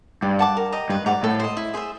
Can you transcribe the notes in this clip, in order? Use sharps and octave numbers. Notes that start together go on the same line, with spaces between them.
G2 D5
F#5 A5 D6
A#4
D#5 G5 A#5
G2 B4
G#2 D5 F#5 A#5
A2 A4
C5 D#5
E4
G#4 C5 E5